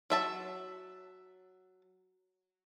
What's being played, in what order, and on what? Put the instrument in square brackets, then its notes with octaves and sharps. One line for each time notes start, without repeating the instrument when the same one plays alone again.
[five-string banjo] F#3 E5 A5